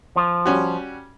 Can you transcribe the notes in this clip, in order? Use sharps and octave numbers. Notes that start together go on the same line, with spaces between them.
F3
G3 C#4 F#4